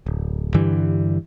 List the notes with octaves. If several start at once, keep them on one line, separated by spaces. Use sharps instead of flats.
D1
G2 D3 E3 G3